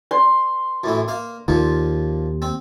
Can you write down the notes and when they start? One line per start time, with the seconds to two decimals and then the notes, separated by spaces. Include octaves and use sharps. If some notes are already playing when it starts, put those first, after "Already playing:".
0.11 C6
0.84 F#2 A2 E3
1.08 A#3 F5
1.48 D#2 A#2 F3
2.42 C4